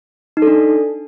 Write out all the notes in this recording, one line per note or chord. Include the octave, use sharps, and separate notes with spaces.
D#4
A4
D4